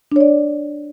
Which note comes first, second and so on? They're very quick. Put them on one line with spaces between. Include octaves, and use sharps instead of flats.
D4 C#5 D5